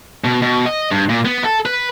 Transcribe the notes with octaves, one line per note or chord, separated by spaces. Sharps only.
B2
B2
D#5
G2
A#2
B3
A4
B4